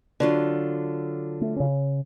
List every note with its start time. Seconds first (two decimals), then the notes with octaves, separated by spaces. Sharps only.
0.20 D3 F#3 F4
1.41 A3
1.56 C#3 C#4